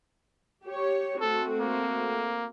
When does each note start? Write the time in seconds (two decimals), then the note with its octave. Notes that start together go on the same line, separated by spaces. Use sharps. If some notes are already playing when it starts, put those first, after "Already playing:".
0.65 G4 C#5
1.21 A3 C4 F#4 A4
1.60 A#3